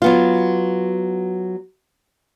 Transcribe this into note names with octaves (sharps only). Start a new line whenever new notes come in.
F#3 B3 F4